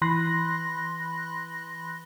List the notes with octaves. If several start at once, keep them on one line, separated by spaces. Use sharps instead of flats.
E3 B5 C6 F#6 A#6